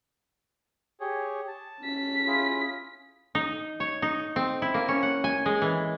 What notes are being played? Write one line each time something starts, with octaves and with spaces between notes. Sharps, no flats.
G4 G#4 C#5
A5
C#4 B6
E4 F4 G#4
D#4
C#5
D#4
C4
E4
A#3
C#4
F#5
G#5
G#3
E3